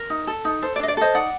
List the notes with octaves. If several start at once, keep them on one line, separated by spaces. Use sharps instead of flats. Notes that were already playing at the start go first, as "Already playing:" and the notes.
Already playing: A#4
D#4
A4
D#4
A4 C5
D5
D4 D#5
D5
A4 C5 D#5
D#4 D5 F#5